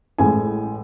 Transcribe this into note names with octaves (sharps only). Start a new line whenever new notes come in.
A1 A2 G#3 G#5